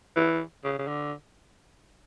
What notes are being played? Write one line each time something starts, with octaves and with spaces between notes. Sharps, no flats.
E3
C#3
C#3
D3